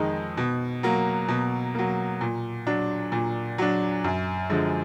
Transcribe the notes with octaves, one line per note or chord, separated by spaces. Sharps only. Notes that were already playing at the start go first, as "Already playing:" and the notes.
Already playing: F2 D#3 G#3 D#4
B2
F#3 A#3
B2
F#3 A#3
A#2
F#3 D4
A#2
F#3 D4
F#2
D3 F3 G#3